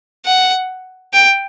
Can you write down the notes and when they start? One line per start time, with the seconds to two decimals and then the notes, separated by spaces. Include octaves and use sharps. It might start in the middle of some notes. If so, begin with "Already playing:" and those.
0.25 F#5
1.13 G5